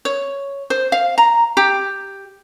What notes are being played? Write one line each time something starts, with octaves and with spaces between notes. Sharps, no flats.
C#5
C5
F5
A#5
G4